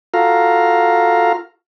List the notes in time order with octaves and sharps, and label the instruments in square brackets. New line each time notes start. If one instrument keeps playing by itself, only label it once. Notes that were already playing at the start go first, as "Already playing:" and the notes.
[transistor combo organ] F4 F#4 A4 F5 A#5